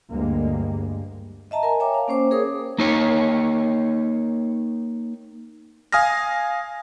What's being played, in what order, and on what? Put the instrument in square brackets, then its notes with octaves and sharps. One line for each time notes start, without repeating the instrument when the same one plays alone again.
[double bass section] D2 G2 G3 G#3 A#3
[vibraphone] D#5 E5 A5 A#5
A#4 G#5
C#5 E5 G5 G#5 A#5 D6
F5
A#3 C#4 C5 D6
G#4 A#4 C#5 D6 D#6
[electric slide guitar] A#3 D#4 C#5
[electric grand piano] F5 G#5 D#6 F6 A#6